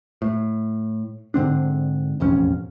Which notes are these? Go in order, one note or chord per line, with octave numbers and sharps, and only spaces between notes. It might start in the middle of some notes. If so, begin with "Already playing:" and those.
A2
G#2 D3 C4 D4
E1 A1 F2 C#4